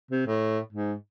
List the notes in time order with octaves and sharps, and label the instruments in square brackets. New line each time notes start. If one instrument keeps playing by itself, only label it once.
[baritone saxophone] C3
A2
G#2